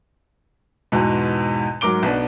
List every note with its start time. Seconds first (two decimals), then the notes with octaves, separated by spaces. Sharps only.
0.92 E2 G#2 B2
1.81 G#2 F#3 A#4 D6 D7 G7
2.03 B1 B3 D4